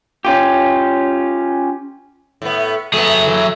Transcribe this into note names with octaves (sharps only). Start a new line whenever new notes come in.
C#4 F4 G4
A2 B3
F#3 A3 B3 G#4
E3